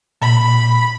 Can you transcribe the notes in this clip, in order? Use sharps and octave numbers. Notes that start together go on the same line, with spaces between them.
A#2 B5